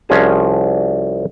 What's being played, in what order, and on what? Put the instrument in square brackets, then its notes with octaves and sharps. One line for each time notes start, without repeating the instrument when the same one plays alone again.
[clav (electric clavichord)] C2 F3 C#4 F#4 G#4 A5